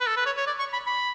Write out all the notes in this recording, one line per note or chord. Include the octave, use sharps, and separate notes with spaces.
B4
A4
B4
C#5
C#5
D5
C#6
B5
B5